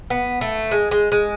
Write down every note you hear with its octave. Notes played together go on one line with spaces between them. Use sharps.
B3
A3
G#3
G#3
G#3